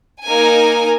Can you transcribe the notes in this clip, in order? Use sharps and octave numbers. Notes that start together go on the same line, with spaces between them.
A#3 D#4 A#4 G#5